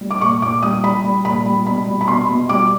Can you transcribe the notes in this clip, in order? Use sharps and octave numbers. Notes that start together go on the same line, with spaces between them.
G3
D6
A#2 C#6
A#2 D6
G3 D#6
G3 B5
G3
A#2 B5
G3
B2 B5
G3
B5
B2 C6
B2
G3 D6